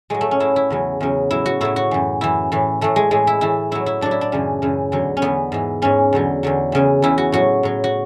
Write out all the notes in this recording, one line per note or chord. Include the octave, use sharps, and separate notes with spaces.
A2 F#3 G#3
A3
C#4
A2 F#3 E4
E4
E2 C#3 F#3
E2 C#3 F#3
A2 F#3 E4
F#4
A2 F#3 E4
F#4
F#2 E3
F#2 E3 E4
A2 E3
A2 E3 A3
G#3
A2 E3 G#3
E4
A2 E3 E4
A2 F#3 E4
E4
A2 F#3 D4
E4
D4
F#2 C#3 E3
F#2 C#3 E3
E2 D3 F#3
C#4
E2 D3 F#3 B3
G#2 E3
G#2 E3 C#4
E2 D3 F#3
E2 D3 F#3
E2 C#3 E3
E2 C#3 E3 E4
F#4
A2 F#3 F#4
A2 F#3
F#4